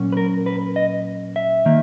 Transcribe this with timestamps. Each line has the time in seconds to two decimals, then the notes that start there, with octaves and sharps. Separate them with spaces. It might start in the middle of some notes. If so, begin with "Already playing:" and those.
Already playing: A#2 F#3 C#4
0.12 B4
0.17 A#4
0.46 B4
0.76 D#5
1.36 E5
1.66 D#3 A#3